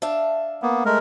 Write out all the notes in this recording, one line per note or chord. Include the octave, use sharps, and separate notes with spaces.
D4 E5 F5
A#3 B3
G#3 A3 A#4